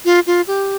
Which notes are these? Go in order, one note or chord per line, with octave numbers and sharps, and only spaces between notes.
F4
F4
G4